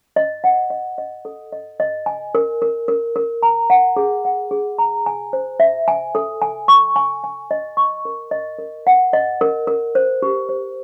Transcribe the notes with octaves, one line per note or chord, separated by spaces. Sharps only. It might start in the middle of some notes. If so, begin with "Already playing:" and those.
D#5
F#5
D#5
D#5
A4
D#5
D#5
G#5
A#4
A#4
A#4
A#4
A#5
F#5
G#4
F#5
G#4
A#5
G#5
C5
E5
G#5
A4
G#5
C#6
G#5
G#5
D#5
C#6
A#4
D#5
A#4
F#5
D#5
A#4
A#4
C5
G4
C5